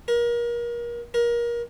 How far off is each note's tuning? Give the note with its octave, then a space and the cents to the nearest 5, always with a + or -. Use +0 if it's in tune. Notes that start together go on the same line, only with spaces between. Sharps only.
A#4 +30
A#4 +25